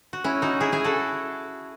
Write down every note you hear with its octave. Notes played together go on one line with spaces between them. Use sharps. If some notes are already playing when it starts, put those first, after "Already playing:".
F#4
C#4 E4
D#4 F#4
E4 G#4
E4 G#4
F#4 A4